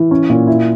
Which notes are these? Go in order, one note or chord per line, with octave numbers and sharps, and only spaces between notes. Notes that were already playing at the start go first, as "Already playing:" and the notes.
Already playing: E3
C#4
A#2
E4